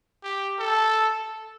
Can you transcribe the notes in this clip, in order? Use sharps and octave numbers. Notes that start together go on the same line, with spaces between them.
G4
A4